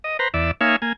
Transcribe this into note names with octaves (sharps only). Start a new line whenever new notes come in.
D#5
B4 C5 A#5
E2 D5 E5
A#3 D#4 C#5 E5 F5 G#5
A#3 G#5